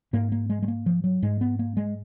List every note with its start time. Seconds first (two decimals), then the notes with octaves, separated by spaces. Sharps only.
0.13 G#2 A#3
0.32 A#3
0.50 G#3
0.62 G#3
0.68 A#3
0.86 F3
1.04 F#3
1.22 G#2 G#3
1.41 B3
1.59 A#3
1.77 G#3